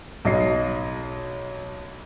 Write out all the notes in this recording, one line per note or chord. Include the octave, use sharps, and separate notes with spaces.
B1 D#5 C7